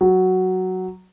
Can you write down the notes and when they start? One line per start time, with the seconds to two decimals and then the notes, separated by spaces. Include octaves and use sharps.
0.01 F#3